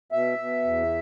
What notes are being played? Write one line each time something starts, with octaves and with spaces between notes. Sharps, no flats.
B2 E5
B2
E2